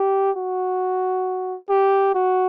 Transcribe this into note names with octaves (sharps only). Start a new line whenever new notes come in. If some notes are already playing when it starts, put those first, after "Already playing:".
Already playing: G4
F#4
G4
F#4